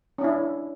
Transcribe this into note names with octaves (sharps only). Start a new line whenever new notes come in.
C#4 D4 E4